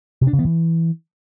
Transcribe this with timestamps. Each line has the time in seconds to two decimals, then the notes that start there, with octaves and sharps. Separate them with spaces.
0.21 C3
0.27 D4
0.33 C#3
0.39 B3
0.45 E3